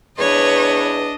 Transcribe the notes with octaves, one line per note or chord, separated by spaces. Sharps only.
E2 D4 B4 C#5 D#5